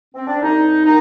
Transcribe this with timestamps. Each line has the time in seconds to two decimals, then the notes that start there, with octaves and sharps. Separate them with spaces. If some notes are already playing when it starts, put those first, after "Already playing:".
0.15 C4
0.27 D4
0.42 C2 D#4
0.85 D#3 A#3 D#4